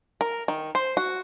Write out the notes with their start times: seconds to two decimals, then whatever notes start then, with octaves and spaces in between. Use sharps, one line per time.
0.21 A#4
0.48 D#3
0.75 C5
0.97 F#4